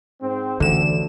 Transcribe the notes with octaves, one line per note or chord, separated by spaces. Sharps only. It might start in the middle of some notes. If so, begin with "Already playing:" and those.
G#2 C4
A1 D2 D3 E3 E7